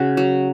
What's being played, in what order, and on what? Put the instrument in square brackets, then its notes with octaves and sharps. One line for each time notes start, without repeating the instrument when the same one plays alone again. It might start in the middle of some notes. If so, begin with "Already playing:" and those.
Already playing: [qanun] C#3 F#4
F#3